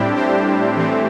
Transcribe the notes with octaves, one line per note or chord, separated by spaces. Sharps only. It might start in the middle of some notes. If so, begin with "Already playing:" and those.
Already playing: A2 G3 C4 D4 E4 G4
G4 C5
A2 E3 A3 C4